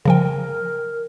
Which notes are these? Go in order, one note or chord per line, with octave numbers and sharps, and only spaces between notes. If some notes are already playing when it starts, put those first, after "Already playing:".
C#3 F3 A#4 G5